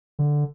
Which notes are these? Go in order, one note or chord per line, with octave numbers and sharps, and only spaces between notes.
D3